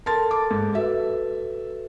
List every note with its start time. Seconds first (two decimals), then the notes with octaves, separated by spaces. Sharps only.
0.06 A4 A#4 A5 C6 A6
0.31 D6
0.51 G#2
0.75 F#4 A4 B4 E5